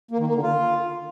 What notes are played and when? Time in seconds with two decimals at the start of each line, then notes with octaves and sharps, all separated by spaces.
0.11 A#3
0.19 D#3
0.27 A#3
0.35 D3
0.43 F4